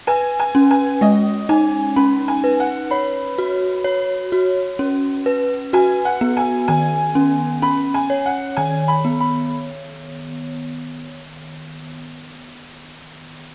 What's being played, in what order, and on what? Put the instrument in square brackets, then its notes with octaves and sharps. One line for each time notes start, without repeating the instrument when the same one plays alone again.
[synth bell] B4 [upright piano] G#5
[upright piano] G#5
[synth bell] C#4
[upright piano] G#5
[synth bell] G#3 [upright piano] D#5
[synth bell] D#4 [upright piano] G#5
[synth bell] C#4 [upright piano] B5
[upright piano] G#5
[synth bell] B4
[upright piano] F#5
[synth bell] C#5 [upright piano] B5
[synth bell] F#4
C#5
F#4
C#4
B4
[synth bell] F#4 [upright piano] G#5
[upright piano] F#5
[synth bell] B3
[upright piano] G#5
[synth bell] D#3 [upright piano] G#5
[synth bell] C#4
[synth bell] C#4 [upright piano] B5
[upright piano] G#5
[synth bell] C#5
[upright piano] F#5
[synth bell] D#3 [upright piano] G#5
[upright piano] B5
[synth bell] B3
[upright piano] B5